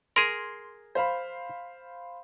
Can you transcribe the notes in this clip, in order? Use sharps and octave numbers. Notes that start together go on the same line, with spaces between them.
G#4 A#4 C6
C5 F5 B5